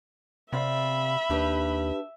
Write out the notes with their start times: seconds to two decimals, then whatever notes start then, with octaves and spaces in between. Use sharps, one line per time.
0.53 C3 C4 D5 E5 F5 B5
1.30 D#2 D4 G4 B4